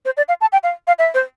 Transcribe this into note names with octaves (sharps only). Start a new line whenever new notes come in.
C5
D5
F5
A5
G5
F5
F5
E5
C5